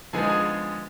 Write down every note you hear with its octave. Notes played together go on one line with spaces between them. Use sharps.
D3 F3 G#3 B3 D#4 G#4 G#5
G#4 G#5